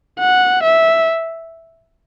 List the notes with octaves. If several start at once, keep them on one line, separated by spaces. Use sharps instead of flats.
F#5
E5